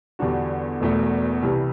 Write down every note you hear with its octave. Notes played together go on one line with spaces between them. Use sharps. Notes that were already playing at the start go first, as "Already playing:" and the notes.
E2 D3 G3 D4 F#4
E1 E2 B2 A3
C2 C3 E3 G3